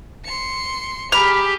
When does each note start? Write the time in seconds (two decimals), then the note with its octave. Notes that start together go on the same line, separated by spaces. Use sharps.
0.25 C6 C#7
1.12 G4 G#4 A#5 B5 F6 B6